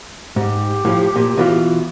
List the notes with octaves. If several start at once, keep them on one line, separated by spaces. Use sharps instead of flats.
G#2 G4
A2 F3
A#2
B2 E3 F4